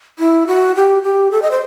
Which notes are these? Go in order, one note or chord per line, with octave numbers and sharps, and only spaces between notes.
E4
F#4
G4
G4
A4
D#5
C5